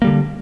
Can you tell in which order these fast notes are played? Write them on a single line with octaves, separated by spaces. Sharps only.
A#3 G3 D3